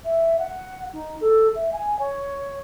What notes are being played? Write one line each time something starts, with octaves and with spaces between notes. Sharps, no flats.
E5
F#5
D#4
A4
E5
G#5
C#5